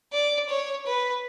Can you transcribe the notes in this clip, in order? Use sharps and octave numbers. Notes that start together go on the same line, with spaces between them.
D5
C#5
B4